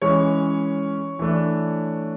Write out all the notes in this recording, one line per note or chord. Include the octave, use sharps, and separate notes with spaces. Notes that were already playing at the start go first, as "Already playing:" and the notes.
E3 G#3 C#4 C#5
E3 A3 D4